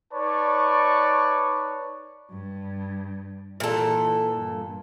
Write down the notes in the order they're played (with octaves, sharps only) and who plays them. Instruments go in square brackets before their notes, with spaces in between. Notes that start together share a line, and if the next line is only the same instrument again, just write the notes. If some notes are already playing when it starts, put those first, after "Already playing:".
[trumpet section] D#4 B4 C#5 D5 A5 C#6
[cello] G2
[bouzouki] A#2 A4 [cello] E3
[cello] G2